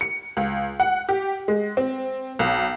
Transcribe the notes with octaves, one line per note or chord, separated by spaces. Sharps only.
C#7
C#2
F#5
G4
G#3
C4
B1